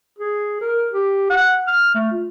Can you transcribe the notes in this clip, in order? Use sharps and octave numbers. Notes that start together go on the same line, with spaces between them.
G#4
A#4
G4
F#5
F6
A3
F4